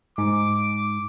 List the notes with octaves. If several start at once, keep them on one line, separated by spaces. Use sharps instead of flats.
G#2 D6